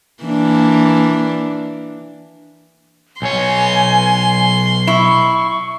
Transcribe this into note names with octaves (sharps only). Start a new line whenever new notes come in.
E3 A#3 D4
B1 C#5 G#5 C6
E4 C#6